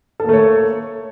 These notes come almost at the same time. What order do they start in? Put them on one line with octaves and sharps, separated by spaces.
A4 A#3 A3 C#5